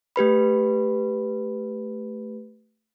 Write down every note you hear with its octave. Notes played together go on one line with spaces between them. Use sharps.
A3 G4 B4 B5